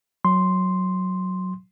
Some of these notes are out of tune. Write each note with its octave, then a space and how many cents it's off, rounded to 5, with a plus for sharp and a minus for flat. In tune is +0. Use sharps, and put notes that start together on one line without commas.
F#3 +0 C6 +0